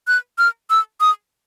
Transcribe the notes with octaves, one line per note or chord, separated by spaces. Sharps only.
F#6
F6
E6
D#6